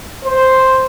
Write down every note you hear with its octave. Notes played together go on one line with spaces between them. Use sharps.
C5